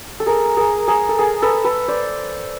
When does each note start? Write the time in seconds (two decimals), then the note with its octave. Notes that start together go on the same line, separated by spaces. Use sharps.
0.20 A4
0.26 G#4 A#4
0.57 G#4 A#4
0.88 G#4 A#4
1.09 A4
1.19 G#4 A#4
1.42 A4 B4
1.64 A4 B4
1.88 C5 D5